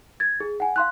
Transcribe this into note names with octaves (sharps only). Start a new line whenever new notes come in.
G#6 A6
G#4
F#5 G#5
F5 C6 F#6